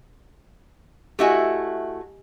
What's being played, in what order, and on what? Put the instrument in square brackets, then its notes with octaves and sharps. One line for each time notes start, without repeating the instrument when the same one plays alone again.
[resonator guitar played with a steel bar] A3 E4 F#4 [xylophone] G4 D#5 G#5